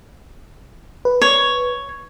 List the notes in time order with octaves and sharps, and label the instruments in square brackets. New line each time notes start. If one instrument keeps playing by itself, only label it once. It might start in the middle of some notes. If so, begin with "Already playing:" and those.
[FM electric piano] B4
[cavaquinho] C#5